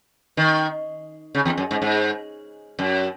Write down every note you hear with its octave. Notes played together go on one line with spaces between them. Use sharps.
D#3
C#3
E2
F#2
G#2
G#2
F#2